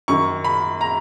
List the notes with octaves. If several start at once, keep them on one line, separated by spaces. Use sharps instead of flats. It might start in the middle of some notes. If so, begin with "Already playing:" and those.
F#2 D#3 C#6
B5
A#5